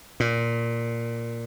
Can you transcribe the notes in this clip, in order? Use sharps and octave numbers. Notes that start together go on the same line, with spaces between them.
A#2